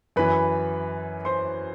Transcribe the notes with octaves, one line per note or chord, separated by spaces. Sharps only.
F#2 E3 B4 B5
C5 C6